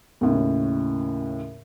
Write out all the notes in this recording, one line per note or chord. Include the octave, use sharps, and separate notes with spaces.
D#2 A2 C#3